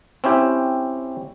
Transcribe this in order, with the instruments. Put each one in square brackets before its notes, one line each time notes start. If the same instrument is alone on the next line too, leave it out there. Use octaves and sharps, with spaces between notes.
[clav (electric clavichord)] C4 C#4 E4 G4